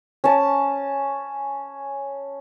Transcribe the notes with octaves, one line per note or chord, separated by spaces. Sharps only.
C#4 A5